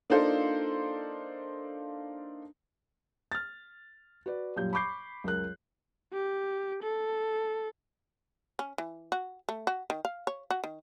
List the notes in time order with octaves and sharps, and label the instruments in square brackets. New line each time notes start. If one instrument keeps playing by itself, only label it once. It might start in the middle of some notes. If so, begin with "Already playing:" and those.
[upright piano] A#3 D4 D#4 F4 A4 C5
[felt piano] F6 A6
F#4 B4 D5
F#2 A#2 G3 G6
B5 C#6 D6 G6 C7
C#2 F#2 A#4 F#6
[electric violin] G4
A4
[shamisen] C#4
E3
F#4
A3
F#4
D#3
F5
C#5
F#4
D#3